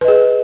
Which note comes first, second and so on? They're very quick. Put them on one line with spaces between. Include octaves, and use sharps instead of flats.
B4 D#5 G#4